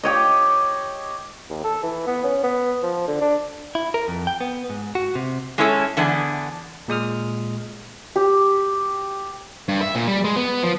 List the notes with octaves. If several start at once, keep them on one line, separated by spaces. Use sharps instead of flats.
G4 C#5 D#5
D#2
A4
E3
B3
C#4
B3
F3
D3
D4
E4
A#4
F2
G5
B3
G#2
F#4
C3
G#3 C#4 E4 A4 C#5
D3 E3 B3 D4 G#4
A#2 G#3 D#6 F6
G4
G2
E5
A#2
G3
G#3
B3
F3